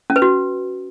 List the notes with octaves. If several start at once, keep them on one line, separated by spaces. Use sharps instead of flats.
C#4
B4
F#4